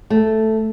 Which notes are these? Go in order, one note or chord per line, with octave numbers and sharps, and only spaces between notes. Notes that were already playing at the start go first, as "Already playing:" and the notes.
A3